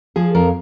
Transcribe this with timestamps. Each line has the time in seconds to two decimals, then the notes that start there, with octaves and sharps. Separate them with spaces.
0.16 F3 G#4
0.35 F2 A#4